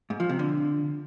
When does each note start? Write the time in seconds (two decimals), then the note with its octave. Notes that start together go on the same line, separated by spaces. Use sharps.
0.10 G#2
0.20 F3
0.29 C3
0.39 D3